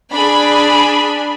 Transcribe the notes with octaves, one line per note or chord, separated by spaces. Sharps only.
D4 G#4 B5